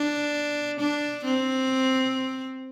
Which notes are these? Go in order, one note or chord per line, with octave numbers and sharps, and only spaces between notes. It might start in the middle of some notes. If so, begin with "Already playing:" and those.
Already playing: D4
D4
C4